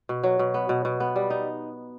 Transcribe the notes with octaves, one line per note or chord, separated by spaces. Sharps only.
B2
F#3
B2
B3
B2
B2
B3
G3
D#4